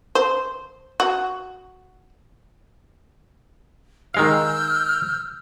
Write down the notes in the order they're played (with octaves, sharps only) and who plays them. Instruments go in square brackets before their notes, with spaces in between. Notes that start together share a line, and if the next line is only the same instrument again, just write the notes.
[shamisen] C5
F#4
[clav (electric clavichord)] D#3 G#3 F5 [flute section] E6 F6 G6